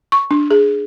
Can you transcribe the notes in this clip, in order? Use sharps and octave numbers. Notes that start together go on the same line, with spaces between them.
C#6
D4
G#4